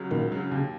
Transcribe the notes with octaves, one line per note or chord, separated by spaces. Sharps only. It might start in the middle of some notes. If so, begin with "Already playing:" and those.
Already playing: C#2 C#3 F#3
C#2 A#2 D#3
C#3 F#3
D#2 C#3